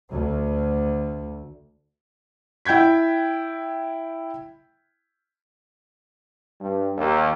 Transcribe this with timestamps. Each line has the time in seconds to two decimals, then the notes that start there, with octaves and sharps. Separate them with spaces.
0.10 D2
2.65 E4 G5 G6 G#6 B6
6.61 G2
6.97 D#2